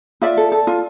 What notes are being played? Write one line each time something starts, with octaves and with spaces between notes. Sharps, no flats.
F4 D5 E5
A4
A4
F4